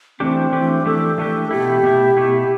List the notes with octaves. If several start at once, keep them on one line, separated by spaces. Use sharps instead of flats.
E3 A3 C4 D4 G4
E3 A3 D4 G4
E3 A3 D4 G4 A4
E3 A3 D4 G4
B2 A3 E4 G4
B2 A3 E4
B2 A3 E4